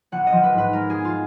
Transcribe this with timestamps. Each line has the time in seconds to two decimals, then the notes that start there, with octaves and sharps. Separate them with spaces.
0.12 A#1 F#5
0.27 D#5
0.33 F3
0.43 B4
0.53 G#2
0.58 B4
0.73 G#3 A#4
0.90 G#4
0.95 B3
1.05 F4